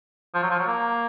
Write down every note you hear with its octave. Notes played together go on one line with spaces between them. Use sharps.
F3
F#3
F3
F#3
A#3